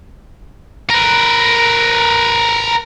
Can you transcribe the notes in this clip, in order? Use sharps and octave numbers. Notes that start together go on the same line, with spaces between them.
A#4 B4